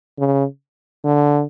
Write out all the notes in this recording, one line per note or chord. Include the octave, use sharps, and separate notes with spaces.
C#3
D3